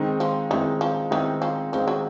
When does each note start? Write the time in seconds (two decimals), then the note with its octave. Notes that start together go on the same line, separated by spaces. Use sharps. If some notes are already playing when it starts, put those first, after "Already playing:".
Already playing: D#3 G#3 C4 D#4
0.20 F3
0.50 D#3 E3 G#3 C4 D#4
0.81 F3
1.11 D#3 E3 G#3 C4 D#4
1.42 F3
1.72 D#3 F3 G#3 C4 D#4
1.88 F#3